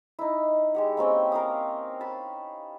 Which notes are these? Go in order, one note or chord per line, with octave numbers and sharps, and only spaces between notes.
D#4 E4
G#3 G4 F#5
A#3 C4 C#4 G5
A#4 F5 D#6
A5 B5